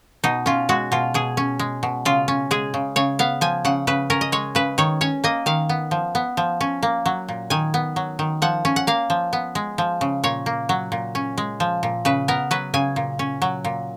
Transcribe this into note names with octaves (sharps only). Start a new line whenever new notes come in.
B2 D#4
C#4 F4
G#3 F#4
B2 F4
B2 G#4
C#4
G#3
B2
C#3 F4
C#4
G#3 G#4
C#3
C#3 C#5
B3 F5
F3 G#5
C#3 F#5
C#3 B4
C#4 A#4
D#5
G#3 C#5
C#3 B4
D#3 C#5
C#4 C#5
A#3 D#5
D#3 F5
B3
F3
B3
F3
C#4
A#3
F#3
A#2
D#3 G#5
B3
F#3
D#3
F3 F#5
C#4
F#5
A#3 F5
F3
B3
G#3
F3
C#3
A#2 C#5
A#3
F#3
A#2
C#4
G#3
F3
A#2
C#3 B4
B3 A#4
F#3 B4
C#3 G#5
A#2
C#4
F#3
A#2